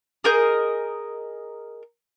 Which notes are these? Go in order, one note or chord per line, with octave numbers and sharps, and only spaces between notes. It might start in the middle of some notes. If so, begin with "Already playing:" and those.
G#4 A#4 D#5 G6